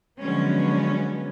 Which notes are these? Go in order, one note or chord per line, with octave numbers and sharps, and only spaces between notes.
D3 F3 F#3 G#3 B3 C#4